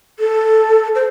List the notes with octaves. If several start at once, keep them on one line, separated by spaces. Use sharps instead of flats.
A4
C5